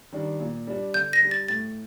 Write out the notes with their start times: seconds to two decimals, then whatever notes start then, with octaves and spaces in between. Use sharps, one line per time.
0.12 D#3 G3 D4
0.40 A#2
0.67 G3 D4
0.94 D3 G6
1.13 A#6
1.22 G3 D4
1.31 A6
1.48 A2 A6